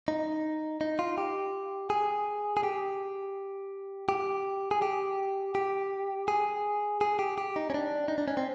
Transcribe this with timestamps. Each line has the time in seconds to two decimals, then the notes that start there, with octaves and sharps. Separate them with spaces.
0.08 D#4
0.81 D#4
0.99 F4
1.18 G4
1.90 G#4
2.57 G#4
2.63 G4
4.09 G4
4.71 G#4
4.82 G4
5.55 G4
6.28 G#4
7.01 G#4
7.19 G4
7.38 G4
7.56 D#4
7.70 C#4
7.74 D4
8.08 D#4
8.18 D4
8.28 C#4
8.37 C4